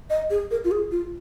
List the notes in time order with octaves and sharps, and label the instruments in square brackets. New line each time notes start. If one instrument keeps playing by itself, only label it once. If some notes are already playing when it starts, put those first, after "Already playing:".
[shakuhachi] D#5
G#4
A#4
F4
G#4
F4